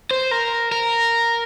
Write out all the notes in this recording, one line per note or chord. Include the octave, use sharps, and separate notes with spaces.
C5
A#4
A#4